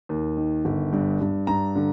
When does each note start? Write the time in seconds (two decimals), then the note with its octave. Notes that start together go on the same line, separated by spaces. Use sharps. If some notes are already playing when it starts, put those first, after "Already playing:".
0.09 D#2
0.37 D#3
0.65 G1
0.93 G2
1.21 G2
1.47 G2 A#5
1.76 D3